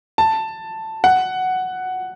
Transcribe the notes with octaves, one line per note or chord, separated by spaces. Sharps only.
A5
F#5